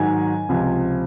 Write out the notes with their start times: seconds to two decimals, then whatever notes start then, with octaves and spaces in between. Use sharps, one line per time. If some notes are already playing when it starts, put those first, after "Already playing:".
Already playing: G#2 D#3 F#3 G#5
0.49 C#2 C3 F3